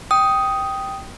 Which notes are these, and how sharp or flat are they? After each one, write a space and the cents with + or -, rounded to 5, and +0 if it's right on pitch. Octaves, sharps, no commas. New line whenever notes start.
G5 -5 D#6 +5